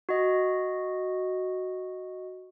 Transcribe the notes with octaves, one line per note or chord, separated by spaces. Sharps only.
F#4 D#5